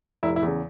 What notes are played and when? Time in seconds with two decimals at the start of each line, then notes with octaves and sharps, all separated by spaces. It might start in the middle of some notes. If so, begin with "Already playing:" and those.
0.23 F1 E4
0.36 E4
0.43 E2 C#3